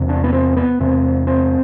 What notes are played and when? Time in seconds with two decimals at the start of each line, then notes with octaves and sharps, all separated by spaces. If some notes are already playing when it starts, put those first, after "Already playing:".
Already playing: E2 C3
0.09 D4
0.24 B3
0.33 C4
0.57 B3
0.80 E2 C3 C4
1.27 C4